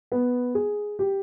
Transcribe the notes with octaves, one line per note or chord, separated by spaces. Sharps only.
B3
G#4
G4